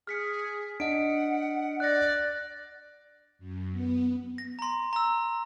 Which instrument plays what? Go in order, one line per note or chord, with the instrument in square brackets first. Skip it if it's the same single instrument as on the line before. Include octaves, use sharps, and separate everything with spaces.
[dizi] G#4 [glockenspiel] F6 B6 C#7
[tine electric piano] D4 D#5 [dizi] F#5 [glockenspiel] D7
[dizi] D5 [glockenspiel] F#6 A#6
[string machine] F#2
B3
[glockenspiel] A#6
A#5 C6
A#5 E6